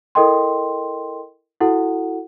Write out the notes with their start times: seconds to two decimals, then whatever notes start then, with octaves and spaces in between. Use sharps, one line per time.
0.15 E4 A4 A#4 D#5 G5 C6
1.61 E4 F#4 A4 F#5